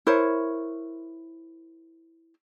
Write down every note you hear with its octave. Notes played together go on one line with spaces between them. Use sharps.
E4 A#4 C5 C#5